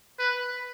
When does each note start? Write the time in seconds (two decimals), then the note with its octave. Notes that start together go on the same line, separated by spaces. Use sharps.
0.19 B4